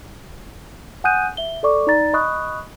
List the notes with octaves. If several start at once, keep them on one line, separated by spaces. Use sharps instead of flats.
F#5 G#5 D#6 F#6 G6 D#7
E5 G7
A4 D5 C#6 D6
D#4 D5 A#5 A6
D#5 B5 C#6 D#6 F#6